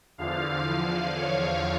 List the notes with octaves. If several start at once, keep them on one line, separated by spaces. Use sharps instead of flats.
E2 D3 F3 F5
F5
C#5